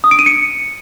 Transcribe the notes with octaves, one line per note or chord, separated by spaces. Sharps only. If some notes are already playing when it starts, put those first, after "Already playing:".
D#6
D7
D#7
C#7